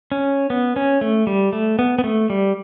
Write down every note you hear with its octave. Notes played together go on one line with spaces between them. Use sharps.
C#4
B3
C#4
A3
G3
A3
B3
B3
A3
G3